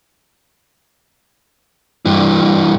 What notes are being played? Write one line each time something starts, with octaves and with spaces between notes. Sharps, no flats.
G2 E3